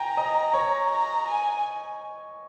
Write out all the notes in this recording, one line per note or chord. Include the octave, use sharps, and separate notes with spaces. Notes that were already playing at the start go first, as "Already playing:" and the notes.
Already playing: G5 G#5 A#5
D#5
C#5
A#5
G#5